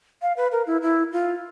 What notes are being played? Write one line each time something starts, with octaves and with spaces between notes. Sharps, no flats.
F5
B4
A#4
E4
E4
F4